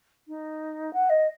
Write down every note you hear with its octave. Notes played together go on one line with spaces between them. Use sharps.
D#4
F#5
D#5